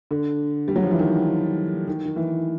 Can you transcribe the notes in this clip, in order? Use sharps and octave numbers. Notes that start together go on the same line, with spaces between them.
D3
G3
F#3
F3
E3
D#3
D#3
D#3
E3